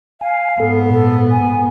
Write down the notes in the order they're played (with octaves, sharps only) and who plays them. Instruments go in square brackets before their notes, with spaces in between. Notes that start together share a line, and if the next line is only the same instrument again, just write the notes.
[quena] F5 [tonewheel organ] G#5
[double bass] G#2 B3 [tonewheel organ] A4
[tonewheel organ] A#2 [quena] A4
[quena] G#5